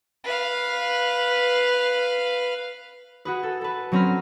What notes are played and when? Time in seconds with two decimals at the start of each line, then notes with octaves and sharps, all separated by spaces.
0.24 B4 F5
3.25 F#4 G#4 B4
3.43 A4
3.61 A4 B4
3.92 F#3 C4 C#4 A#5 B5 F6